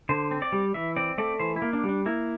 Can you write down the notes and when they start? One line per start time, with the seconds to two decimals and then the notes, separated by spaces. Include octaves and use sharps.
0.09 D3 C5
0.31 C4
0.42 D5
0.52 G3
0.74 E3 E5
0.96 C4 D5
1.18 A3 D5
1.39 E3 C5
1.56 E4
1.62 A#3
1.73 D4
1.84 G3
1.89 D4
2.06 A#3 E4